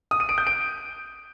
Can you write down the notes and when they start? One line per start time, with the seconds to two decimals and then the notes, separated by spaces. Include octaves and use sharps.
0.11 D#6
0.20 D#7
0.29 D7
0.38 G6
0.47 D7